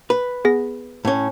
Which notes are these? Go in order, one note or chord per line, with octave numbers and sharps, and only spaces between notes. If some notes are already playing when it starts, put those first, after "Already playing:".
B4
B3 G#4 A#6
A2 C#4